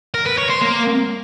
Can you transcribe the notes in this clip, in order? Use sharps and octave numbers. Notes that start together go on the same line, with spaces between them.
A#4
B4
C#5
C5
A#3